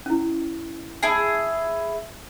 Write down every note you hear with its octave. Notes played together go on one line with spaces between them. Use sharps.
C#4 E4
E4 G#4 G#5 A5